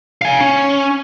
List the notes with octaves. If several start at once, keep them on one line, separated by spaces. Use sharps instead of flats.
F5 G#5
C#4